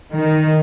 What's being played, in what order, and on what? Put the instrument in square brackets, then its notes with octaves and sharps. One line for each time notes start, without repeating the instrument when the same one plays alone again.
[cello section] D#3